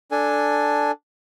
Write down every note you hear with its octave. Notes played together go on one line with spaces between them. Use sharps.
D4 A4 G#5